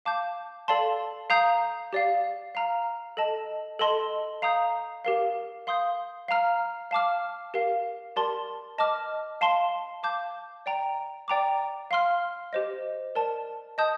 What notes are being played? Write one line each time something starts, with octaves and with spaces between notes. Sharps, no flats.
F5 A5 D6 G6
A4 D5 F5 A5 C6
F5 A#5 D#6 G6
G4 D5 F5
F5 A#5 F6
A4 D#5 A5
A4 D#5 A5 C6
F5 A#5 D#6 G6
G4 A#4 F5
F5 C6 D#6 G6
F5 A#5 F6
F5 A5 D6 F6
G4 A#4 F5
G4 A#4 D5 A5 C6
D#5 A5 D6 F6
F5 A5 C6
F5 A5 D6 G6
D5 G5 A#5
D5 G5 A#5 D6
F5 C6 F6
G4 C5 D#5
A#4 D5 A5
D#5 A5 D#6 G6